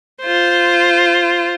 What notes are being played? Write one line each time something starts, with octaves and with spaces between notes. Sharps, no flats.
F4 C5